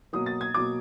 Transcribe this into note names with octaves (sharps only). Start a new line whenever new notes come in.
B2 F#3 A#3 D#6
A6
G#6
B2 F#3 A#3 D6